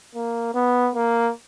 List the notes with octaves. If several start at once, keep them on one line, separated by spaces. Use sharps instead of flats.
A#3
B3
A#3